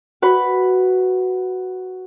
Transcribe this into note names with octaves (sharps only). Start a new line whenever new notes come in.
F#4 B4 B5